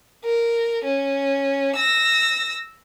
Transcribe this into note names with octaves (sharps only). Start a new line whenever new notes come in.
A#4
C#4
E6 A#6